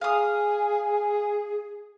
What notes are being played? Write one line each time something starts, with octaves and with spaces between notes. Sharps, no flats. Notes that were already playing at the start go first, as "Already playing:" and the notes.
G#4 F5 G#5 D#6